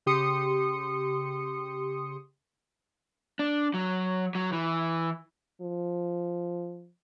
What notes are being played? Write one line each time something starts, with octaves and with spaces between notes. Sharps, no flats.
C#3 G4 C6 D#6 C#7
D4
F#3
F#3
E3
F3